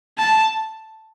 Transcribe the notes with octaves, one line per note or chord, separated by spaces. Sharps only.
A5